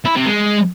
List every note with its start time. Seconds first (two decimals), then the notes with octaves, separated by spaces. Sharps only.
0.05 E4
0.16 C3
0.26 G#3